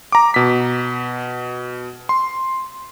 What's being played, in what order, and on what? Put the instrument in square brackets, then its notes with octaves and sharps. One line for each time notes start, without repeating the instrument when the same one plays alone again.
[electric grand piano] A#5 D6
B2 B6
C6